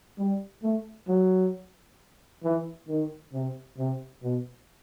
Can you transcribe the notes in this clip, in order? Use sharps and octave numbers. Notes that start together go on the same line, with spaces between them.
G3
A3
F#3
E3
D#3
C3
C3
B2